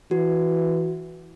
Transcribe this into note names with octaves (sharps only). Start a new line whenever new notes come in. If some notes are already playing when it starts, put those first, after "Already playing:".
E3 F#4